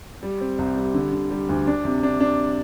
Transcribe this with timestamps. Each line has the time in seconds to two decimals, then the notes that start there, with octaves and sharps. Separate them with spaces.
0.23 G3
0.41 C4
0.58 C2
0.76 G3
0.94 D3
1.13 D3
1.31 G3
1.49 D2
1.67 D4
1.85 C3
2.03 D4
2.20 D4